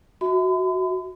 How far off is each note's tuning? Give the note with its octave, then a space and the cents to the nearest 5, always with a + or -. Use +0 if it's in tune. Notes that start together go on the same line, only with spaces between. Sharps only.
F#4 +0 E5 -30 B5 +45